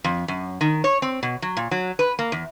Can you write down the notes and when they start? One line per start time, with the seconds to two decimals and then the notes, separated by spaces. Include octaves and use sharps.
0.04 F2
0.28 F#2
0.61 D#3
0.84 C#5
1.02 C4
1.23 B2
1.42 F#3
1.57 A#2
1.71 F#3
1.99 B4
2.19 A#3
2.32 E2